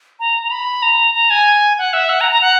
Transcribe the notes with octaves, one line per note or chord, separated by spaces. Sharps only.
A#5
A#5
B5
A#5
A#5
G#5
F#5
E5
F#5
A#5
A#5
F#5